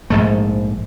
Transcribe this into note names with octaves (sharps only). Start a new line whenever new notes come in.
A#1 G#2 A3